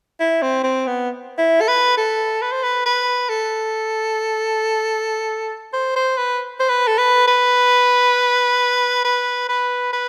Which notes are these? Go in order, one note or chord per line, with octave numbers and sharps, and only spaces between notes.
E4
C4
C4
B3
E4
A4
B4
A4
B4
C5
B4
B4
A4
C5
C5
B4
C5
B4
A4
B4
B4
B4
B4
B4